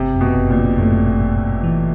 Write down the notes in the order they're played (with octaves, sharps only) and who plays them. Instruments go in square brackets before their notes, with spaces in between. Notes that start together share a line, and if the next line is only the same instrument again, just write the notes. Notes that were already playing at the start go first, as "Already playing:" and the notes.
Already playing: [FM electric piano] G1 [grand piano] C3
[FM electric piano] F#2
[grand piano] B2
[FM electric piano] G1
[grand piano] A#2
[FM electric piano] D3
[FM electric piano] F#2 [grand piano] A2
[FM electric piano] G1
G1
G1
E3